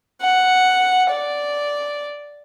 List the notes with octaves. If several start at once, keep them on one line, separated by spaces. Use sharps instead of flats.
F#5
D5